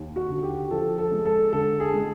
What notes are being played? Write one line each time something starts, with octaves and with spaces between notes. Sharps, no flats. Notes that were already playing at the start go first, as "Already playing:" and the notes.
Already playing: D#2
F#4
D3
G4
F3 A4
A4
G#3
A4
D3 A4
G#4
G#3